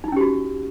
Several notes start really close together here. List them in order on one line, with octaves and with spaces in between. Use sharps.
D#4 E4 C#4 G4 F#4